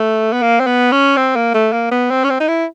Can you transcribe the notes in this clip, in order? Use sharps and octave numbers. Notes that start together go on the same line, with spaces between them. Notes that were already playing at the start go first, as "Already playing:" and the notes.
Already playing: A3
B3
A#3
C4
B3
C#4
C4
A#3
A3
A#3
B3
C4
C#4
C4
D#4
E4